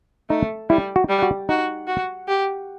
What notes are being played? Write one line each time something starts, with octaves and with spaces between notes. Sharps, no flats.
A3 D#4
G3 E4
F#4
G3
F#4
D#4 F#4
F#4
G4